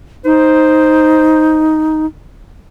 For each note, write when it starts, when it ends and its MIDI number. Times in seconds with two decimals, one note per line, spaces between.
0.25 2.06 63
0.25 1.73 72